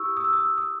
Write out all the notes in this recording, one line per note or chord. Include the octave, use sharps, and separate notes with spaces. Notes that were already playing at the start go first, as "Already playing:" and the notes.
Already playing: E4 G4 C#6 D#6 E6
D#6
E6
D#6
E6
D#6